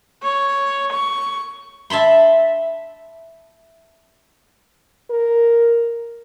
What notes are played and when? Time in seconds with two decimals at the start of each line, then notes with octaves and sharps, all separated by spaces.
0.23 C#5
0.92 C#6
1.90 E5 A5 B5 C6
5.11 A#4